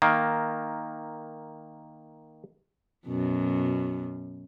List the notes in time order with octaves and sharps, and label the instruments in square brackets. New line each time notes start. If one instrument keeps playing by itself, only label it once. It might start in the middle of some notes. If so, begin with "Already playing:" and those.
[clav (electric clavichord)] D#3 A#3
[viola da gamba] F#2 B2